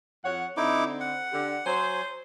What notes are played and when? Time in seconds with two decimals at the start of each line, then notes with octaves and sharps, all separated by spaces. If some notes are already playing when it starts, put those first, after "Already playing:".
0.24 F2 C#5 F#5
0.57 D3 C4 D#4 E4 D6
1.00 F#5
1.32 D3 G4
1.66 F#3 C5 G#5